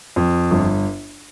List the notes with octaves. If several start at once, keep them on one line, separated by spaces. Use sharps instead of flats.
F2
G1